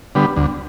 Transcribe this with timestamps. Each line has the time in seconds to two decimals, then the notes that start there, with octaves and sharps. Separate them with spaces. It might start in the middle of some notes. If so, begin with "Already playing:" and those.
0.15 D3 G3 B3
0.36 D2